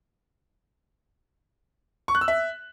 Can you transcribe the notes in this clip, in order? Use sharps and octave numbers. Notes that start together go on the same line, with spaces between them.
C#6
F#6
E6
E5